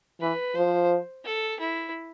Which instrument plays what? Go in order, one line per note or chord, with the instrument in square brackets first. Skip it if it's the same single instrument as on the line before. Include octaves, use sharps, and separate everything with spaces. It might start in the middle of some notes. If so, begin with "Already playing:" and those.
[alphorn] E3 [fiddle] B4
[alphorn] F3 [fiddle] C5
[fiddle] A4
E4